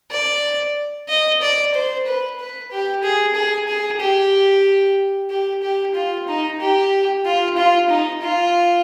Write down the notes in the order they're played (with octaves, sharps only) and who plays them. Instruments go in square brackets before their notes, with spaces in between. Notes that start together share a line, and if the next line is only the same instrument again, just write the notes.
[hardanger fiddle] D5
D#5
D5
C5
B4
B4
G4
G#4
G#4
G#4
G4
G4
G4
F4
D#4
G4
F4
F4
D#4
F4